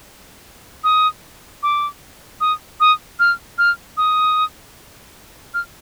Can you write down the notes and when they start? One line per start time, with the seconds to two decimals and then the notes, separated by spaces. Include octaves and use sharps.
0.84 D#6
1.63 D6
2.41 D#6
2.80 D#6
3.20 F6
3.58 F6
3.97 D#6
5.54 F6